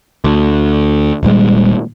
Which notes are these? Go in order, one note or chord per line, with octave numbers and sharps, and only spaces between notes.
D2
D#1 A#2 G3 G#3